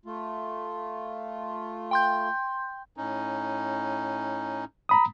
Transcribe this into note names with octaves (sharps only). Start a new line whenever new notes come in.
A3 F4
G5 C6 G6
A2 C#4 D#4
A#5 B5 D#6